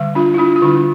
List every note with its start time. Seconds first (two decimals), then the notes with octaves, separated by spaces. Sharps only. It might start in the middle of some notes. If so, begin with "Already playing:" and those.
Already playing: D3 G3
0.15 D4 F4
0.34 E4
0.38 D4 F4
0.56 F4
0.62 D3 G3 D4 E4